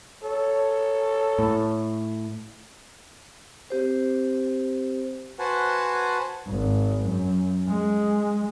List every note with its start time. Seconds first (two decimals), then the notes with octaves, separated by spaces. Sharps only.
0.23 A4 C#5
1.39 A2
3.70 C4 G4 C5
5.39 F#4 B4 C5 F#5 G#5 A5
6.47 G#1
7.04 F#2
7.68 G#3